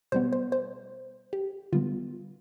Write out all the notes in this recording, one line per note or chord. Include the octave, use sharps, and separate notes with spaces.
B2 G3 B3 C5
C5
C5
G4
D3 G3 B3 F4